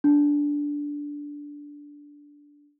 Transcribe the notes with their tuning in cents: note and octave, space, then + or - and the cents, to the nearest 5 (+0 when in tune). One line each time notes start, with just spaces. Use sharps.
D4 -10